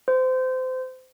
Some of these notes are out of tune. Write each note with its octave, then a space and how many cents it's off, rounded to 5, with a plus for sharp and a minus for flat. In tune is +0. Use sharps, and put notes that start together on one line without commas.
C5 -25